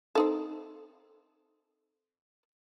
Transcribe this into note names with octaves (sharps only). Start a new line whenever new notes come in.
C4 D#4 A4